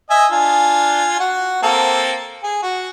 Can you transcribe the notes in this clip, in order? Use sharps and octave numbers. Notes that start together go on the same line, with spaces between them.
D#5 E5 G#5
D4 F4 G#5
F#4 F#5
A#3 C4 A4
G#4
F#4